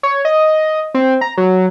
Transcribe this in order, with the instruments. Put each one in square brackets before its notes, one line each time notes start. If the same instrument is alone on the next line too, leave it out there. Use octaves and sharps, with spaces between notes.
[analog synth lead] C#5
D#5
C4
A#5
F#3